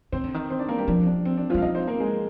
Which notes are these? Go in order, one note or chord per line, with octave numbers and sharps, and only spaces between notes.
D#3 C4 C5
D3
D#3
C4 C5
D4 D5
A#3 A#4
G3 G4
F3 D4
D4
C4
D4
F3 G3 F4
F5
F3 D#4 D#5
C4 C5
A#3 A#4
G#3 G#4